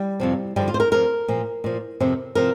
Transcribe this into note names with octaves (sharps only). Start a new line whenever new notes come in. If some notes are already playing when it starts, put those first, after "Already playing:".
Already playing: G3
F2 C3 F3
G2 D3 F3 G3
F4
C5
A#4
F2 F3 A#4
A#2 F3
A#2 F3
F2 C3 F3
C3 F3 A#4